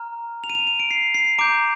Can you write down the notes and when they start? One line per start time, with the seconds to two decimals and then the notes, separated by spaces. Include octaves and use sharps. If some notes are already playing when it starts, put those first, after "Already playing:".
Already playing: A#5 F6
0.44 F7
0.50 D#7
0.55 F7
0.67 D#7
0.80 D7
0.91 C7
1.14 C7
1.38 A#5 D6 G6 D7